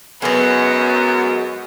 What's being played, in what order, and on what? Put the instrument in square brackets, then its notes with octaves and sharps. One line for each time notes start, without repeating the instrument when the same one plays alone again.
[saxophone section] F#2 [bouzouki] F#3 G#3 [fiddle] B3